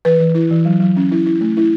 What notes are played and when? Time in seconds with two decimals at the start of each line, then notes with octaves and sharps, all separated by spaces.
0.05 E3 B4
0.20 E3
0.35 E4
0.51 E3
0.65 F#3
0.80 F#3
0.96 C#4
1.11 E4
1.26 E4
1.41 A3
1.57 E4